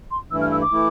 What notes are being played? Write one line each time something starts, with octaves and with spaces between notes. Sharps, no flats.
C6
G2 E3 A3 E4 E6
F6
E6
D6
E3 A3 E4